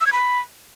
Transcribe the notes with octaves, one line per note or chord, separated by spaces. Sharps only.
E6
G#6
B5